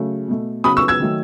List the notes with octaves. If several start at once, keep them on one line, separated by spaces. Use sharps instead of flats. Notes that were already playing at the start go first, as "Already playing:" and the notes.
Already playing: C#3 F#3 A3
B2 A3
C#3 F#3 B3 B5 D#6
C#6 E6
E6 G#6
D#3 F#3 A3